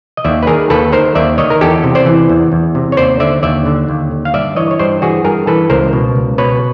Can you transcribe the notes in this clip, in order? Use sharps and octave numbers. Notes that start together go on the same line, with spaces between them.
D#5
D#2 D5 E5
B4
D#3 G#4 A#4
D#2 A4 B4
D#3 A#4 C5
D#2 D5 E5
D#3 C#5 D#5
A#4
E2 G4 A4
C3
C5 D5
E3
E2
E2
C3
C#5
D#2 C5 D5
D3 D5 E5
D#2 D5 E5
D3
D#2
D3
F5
G2 D5 E5
E3 C#5 D#5
C#5
G2 C5 D5
E3 F#4 G#4
G2 G#4 A#4
E3 A4 B4
C#2 A#4 C5
B2
C#2
B2 B4 C#5